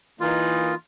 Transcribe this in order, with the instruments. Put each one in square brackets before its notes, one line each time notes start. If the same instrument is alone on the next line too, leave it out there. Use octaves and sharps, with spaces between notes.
[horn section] E3 A#3 D#4 [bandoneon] F4